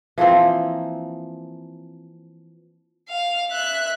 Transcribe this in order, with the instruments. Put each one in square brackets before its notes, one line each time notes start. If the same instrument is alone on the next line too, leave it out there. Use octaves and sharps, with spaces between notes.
[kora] E3 F3 A#3 C4
[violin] F5
E5 F#6